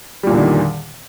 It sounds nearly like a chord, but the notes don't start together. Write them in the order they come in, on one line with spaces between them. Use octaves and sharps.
G3 A#2 E2 D3 D#3